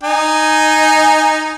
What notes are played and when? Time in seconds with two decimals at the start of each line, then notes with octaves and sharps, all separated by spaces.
0.03 D#4 G#5